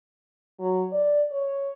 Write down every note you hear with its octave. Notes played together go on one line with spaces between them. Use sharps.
F#3
D5
C#5